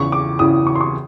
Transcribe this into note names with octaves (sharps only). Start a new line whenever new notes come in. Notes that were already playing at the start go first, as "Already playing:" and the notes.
Already playing: E2 C#3 E3 C#6
D6
E2 C#3 E3 D#6
C#6
C6
C#6